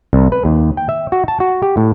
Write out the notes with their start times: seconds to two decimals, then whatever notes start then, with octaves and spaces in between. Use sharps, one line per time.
0.13 C2
0.32 B4
0.45 D#2
0.77 G5
0.89 E5
1.12 F#4
1.28 A5
1.40 F#4
1.63 G4
1.77 A2